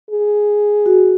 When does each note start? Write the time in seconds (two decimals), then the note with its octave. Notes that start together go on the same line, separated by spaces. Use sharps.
0.11 G#4
0.86 F#4